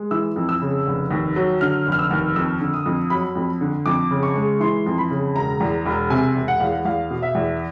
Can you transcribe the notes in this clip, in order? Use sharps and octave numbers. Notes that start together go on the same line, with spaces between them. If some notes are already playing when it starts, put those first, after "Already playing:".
Already playing: G#3
E3 E6
F2
E6
C#3
F1
D#2
F#3
D3 F6
F1
F6
E6
D#2
F2 E6
D3
D#6
F2
F#3 B5
F2
D3
F2 D6
C#3
C#6
G#3
E3 C6
F2
B5
C#3
E1 A#5
E2
E1
C3 G#5
E1
F#5
E2 F5
F#5
E2 F5
B2
E5
E2